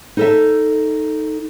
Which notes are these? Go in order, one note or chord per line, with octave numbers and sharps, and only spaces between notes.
D#4 A4 E5